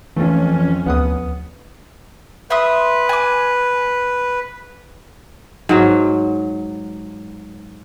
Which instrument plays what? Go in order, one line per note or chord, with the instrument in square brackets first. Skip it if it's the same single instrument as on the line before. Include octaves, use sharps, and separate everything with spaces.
[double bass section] F2 C#4 [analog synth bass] E3 [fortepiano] A3 F4
[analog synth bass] D2 [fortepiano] B3 F#5 D#6
[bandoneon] B4 [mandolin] E5 C6 D#6
[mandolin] G#5 D6
[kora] G#2 F#3